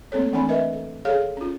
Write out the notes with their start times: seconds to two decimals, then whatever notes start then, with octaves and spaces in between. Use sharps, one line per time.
0.12 A3 A#3 C4 A4 C#5
0.33 E3 A3 C4 D4 G#5 B5
0.49 A#4 B4 D#5 E5
0.73 A4
1.05 G#4 A4 C#5 F5
1.37 C#4 F4